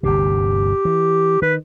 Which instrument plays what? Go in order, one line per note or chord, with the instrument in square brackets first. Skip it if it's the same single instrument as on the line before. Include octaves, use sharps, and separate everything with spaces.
[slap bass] G1 D2 C3 [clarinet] G4
[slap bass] E3
[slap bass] D#3 [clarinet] B4